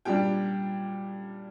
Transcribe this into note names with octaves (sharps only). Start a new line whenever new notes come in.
A#2 G3 D4 G4 G5